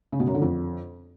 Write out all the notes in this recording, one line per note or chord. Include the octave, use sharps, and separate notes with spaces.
C#3
B2
F#2
D3
F2